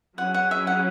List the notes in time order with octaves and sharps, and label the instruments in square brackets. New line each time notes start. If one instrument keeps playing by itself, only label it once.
[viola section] F#3 C#4 E4 G#4 [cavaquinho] F#5
[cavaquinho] F#5
E5
F#5